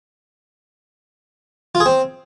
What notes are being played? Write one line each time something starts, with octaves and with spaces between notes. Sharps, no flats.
F4
G#4
C4